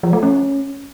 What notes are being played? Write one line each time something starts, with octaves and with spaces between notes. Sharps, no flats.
F3
A3
C#4